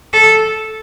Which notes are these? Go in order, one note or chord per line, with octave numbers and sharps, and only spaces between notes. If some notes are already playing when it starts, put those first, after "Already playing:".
A4